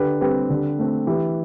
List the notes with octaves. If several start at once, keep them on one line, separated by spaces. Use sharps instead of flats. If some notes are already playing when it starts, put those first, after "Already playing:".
Already playing: D3 G4 B4
G3 C4 G4 B4
D3
A3 C4
E3 E4 G4